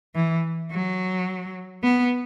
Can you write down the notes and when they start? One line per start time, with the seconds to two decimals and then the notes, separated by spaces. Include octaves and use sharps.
0.15 E3
0.71 F#3
1.83 B3